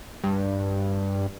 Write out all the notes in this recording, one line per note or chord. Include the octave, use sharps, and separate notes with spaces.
G2